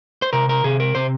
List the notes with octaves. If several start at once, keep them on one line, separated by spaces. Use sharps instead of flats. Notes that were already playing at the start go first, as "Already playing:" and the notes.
C5
C3 A#4
A#4
C3 G#4
A#4
C3 C5